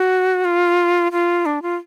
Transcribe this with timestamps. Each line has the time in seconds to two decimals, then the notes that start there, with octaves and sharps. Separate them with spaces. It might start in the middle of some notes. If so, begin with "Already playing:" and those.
Already playing: F#4
0.45 F4
1.12 F4
1.46 D4
1.62 F4